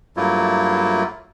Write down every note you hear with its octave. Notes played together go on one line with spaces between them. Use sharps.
G2 F#3 A3 A#3 E4 F4